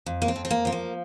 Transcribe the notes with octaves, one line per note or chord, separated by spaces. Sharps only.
F2
A#3
C4
F2
C4
A#3
F3 C4
A#3